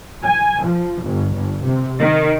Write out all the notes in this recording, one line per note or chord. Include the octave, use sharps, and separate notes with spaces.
G#5
F3
G1
G1
C3
D#3